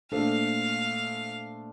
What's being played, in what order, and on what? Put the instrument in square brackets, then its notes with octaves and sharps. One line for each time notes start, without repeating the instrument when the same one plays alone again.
[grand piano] A#2 A3 D4 A4 C5 [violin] F5